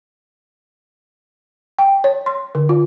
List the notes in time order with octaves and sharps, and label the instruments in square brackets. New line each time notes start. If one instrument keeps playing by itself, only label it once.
[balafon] G5
C#5
C6
D3
F4